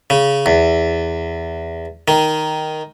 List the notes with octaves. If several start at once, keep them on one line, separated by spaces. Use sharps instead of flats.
C#3
E2
D#3